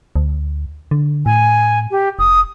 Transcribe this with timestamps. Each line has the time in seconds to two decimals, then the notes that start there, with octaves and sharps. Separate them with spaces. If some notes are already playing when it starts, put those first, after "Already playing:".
0.16 D2
0.91 D3
1.26 A2 G#5
1.91 G4
2.19 F1 D#6